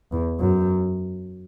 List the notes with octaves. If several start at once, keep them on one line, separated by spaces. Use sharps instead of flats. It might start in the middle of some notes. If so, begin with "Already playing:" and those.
E2
F#2